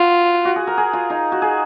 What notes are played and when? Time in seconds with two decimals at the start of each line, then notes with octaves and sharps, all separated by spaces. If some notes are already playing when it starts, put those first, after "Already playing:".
Already playing: F4 F#4
0.45 F#4
0.56 G#4
0.67 A#4
0.77 G#4
0.93 F4
1.10 D#4
1.32 F#4
1.42 G#4